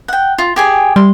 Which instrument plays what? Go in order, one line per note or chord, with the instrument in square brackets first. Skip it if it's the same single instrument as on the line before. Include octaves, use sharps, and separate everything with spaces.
[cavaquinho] F#5 G5
F4
G4 G#4 G#5
[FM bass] G3 [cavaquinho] C6